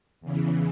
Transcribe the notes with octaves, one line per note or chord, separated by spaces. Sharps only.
E2 C#3 E3